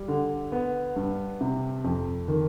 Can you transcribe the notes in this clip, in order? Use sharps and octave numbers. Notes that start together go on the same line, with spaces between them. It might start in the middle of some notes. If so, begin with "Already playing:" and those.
Already playing: G3
D3
B3
G2
C3
F2
D#3